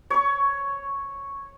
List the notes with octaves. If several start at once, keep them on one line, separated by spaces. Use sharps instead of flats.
C#5 C#6